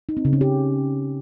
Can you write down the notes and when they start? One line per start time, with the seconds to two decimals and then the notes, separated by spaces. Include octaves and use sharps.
0.09 D#4
0.17 C4
0.25 C#3
0.33 C#4
0.41 G4